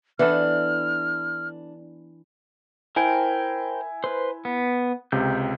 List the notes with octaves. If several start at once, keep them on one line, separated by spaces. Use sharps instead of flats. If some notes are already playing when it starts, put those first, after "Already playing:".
E3 B3 D4 A4 F6
E4 A#4 C5 G5 G#5
B4 C5
B3
C#2 C3 G6